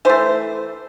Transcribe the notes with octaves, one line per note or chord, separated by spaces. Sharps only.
E3 A3 C5